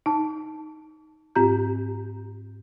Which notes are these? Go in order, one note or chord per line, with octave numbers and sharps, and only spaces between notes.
D#4 A5
G#2 C4 F4 G4 A#5 G6